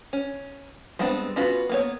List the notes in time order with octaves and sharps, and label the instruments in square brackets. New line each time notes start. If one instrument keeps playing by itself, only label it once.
[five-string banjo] C#4
G3 G#3 B3 C4 D4
B3 C#4 F4 F#4 B4
A#3 B3 C#5